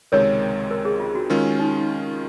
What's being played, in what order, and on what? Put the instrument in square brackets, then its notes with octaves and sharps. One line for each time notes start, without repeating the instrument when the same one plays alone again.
[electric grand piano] C#2 C3 D#3 G#3 C4 [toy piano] A#4 C#5
[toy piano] A#4
G#4
F4
F#4
[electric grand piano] D#3 G#3 C#4 F4 [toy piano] A#4
[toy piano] D#4